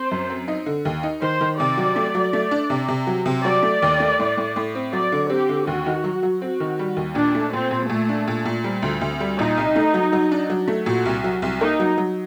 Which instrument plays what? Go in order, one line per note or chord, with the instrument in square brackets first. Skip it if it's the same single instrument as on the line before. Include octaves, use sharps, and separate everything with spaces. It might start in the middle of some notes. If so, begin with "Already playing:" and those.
Already playing: [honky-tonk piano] C4 [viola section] C5
[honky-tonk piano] F#2
C4
D#4
D3
D#2
D#4
[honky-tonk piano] D#3 [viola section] C5
[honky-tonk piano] D#3
[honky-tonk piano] C3 [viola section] D5
[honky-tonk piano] F#3
A3
F#3
A3
D4
C3
C3
F#3
C3
[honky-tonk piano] F#3 [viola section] D5
[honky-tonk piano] A3
D#2
A3
A2
A2
A2
C4
[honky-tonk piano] F#3 [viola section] D5
[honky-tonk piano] D3
[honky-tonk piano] C4 [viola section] G4
[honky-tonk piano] D3
[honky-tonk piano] D#2 [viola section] F#4
[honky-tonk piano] D#3
F#3
F#3
[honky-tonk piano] C4 [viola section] F#4
[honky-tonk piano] D#3
G3
D#2
[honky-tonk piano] A#2 [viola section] D4
[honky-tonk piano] A3
[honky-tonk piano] A#2 [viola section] C4
[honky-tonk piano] A#2
[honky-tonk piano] A#2 [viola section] A3
[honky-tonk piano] D4
A#2
A#2
[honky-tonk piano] G3 [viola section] C4
[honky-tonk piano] D2
D2
G3
[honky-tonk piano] A#2 [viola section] D#4
[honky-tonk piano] C2
A3
F#3
F#3
D4
F#3
A3
[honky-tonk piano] A#2 [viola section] F#4
[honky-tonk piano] C2
F#3
C2
[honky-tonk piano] A#3 [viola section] D#4
[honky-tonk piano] F#3
F#3